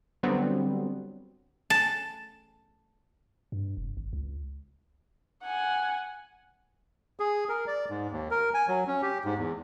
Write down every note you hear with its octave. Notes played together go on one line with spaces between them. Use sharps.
D3 F#3 G3 B3 C4
A5
G2
F1
G#1
C#2
F#5 G#5
G#4
A#4
D5
G#2
D#2
A#4
G#5
F#3
C#4
G4
G#2
E2